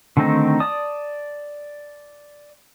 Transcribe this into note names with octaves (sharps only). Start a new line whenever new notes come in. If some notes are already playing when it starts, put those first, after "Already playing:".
D3 D#3 A3 C4 D#4
D5 A5 D#6